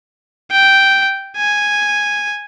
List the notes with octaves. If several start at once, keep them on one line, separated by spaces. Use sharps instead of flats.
G5
G#5